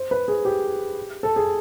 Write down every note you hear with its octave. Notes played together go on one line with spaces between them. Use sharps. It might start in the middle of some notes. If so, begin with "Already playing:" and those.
Already playing: C5
B4
G#4
G4
A4
G#4